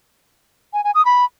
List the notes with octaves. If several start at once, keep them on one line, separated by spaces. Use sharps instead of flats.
G#5
G#5
D#6
B5